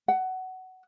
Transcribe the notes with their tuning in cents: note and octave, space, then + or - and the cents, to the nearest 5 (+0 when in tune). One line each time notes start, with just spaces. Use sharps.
F#5 +15